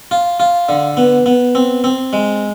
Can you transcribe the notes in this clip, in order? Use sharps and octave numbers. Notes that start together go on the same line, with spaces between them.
F4
F4
D3
B3
B3
C4
C4
G#3